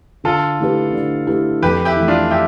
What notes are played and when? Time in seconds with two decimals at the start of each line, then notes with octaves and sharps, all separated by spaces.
0.24 D3 F4 A4
0.59 A3 E4 G4 B4
0.93 D3
1.27 A3 E4 G4 B4
1.63 F2 G4 B4
1.85 E4 G4
1.96 E3 A3
2.08 D4 F4
2.30 E4 G4